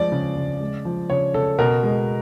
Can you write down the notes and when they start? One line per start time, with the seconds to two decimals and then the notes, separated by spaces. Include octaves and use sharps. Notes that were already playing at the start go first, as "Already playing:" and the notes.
Already playing: F3 G#3 D5
0.12 C#3
0.36 C#3
0.61 G#3
0.85 F3
1.10 C#3 C#5
1.34 C#3 A4
1.58 B2 A#4
1.83 G#3